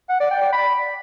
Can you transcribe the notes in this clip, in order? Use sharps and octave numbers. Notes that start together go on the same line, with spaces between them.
F#5
D5
G5
D5
B5